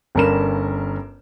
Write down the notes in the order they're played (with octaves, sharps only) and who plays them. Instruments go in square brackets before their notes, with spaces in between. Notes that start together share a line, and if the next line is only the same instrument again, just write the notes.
[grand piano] G1 G2 C#4 A#4 B5 E7